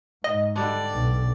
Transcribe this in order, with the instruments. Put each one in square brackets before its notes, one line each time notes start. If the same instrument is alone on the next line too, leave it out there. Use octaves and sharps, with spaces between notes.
[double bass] G#2 [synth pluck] D#5
[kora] D3 G3 D4 [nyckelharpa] D5
[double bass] B1